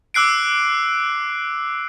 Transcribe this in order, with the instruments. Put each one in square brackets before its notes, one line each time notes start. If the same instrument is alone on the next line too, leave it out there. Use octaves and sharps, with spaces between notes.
[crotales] D6 E6 F#6 C7 D7